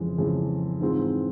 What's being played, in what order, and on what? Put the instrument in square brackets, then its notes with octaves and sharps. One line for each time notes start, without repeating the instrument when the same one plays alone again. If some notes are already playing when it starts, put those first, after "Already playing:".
Already playing: [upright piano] F2 C#3 E3 G#3
F2 C#3 E3 G#3
G#2 E3 G#3 C4 F4